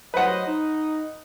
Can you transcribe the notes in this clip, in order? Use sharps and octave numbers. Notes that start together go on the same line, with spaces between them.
F#3 B4 C5 D#5 F#5
D#4